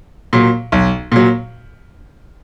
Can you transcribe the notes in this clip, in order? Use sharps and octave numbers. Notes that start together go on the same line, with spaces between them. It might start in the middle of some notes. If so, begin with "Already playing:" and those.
A#2 F#3
B1
A#2 F#3